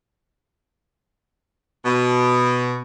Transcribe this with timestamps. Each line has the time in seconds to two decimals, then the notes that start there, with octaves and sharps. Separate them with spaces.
1.85 B2